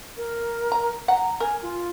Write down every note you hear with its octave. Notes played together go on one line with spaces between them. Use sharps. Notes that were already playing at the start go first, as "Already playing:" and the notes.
A#4
A#5
F#5 A#5
A#4 G#5
F4